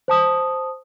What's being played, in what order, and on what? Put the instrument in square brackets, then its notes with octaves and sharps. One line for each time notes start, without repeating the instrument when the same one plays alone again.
[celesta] C5 A5 D#6